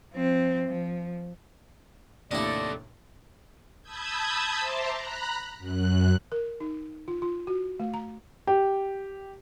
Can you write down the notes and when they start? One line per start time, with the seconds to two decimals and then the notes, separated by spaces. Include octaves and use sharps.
0.13 F3 C4
0.67 F3
2.31 D#2 A2 C3 D4 E4 A4 D5 D#5
3.82 A5 B5 D#6 E6 G6 G#6
4.59 C5 E5 A5 A#5 C6 D6
4.94 A#5 B5 F#6
5.59 F#2 F#6
6.32 A#4
6.60 D#4
7.08 F4
7.22 F4
7.47 F#4
7.80 A3
7.94 A#5
8.47 G4